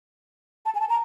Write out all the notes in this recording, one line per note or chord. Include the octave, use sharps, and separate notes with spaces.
A5
G#5
A5
A#5